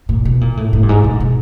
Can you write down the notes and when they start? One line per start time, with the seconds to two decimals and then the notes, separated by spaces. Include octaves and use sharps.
0.09 A#2
0.25 B2
0.41 A#2
0.57 A2
0.73 A2
0.83 G2
0.89 G#2
1.04 A#2
1.20 B2